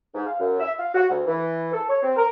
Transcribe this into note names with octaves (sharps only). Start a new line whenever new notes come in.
G#2
F5
F#2
E5
F5
F#4
D2
E3
A4
C#5
C4
A#4